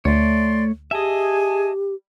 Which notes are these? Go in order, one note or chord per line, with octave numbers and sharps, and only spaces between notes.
D2 A3 C#5 D5 C6
G4 G#4 D#5 E5 G#5 A5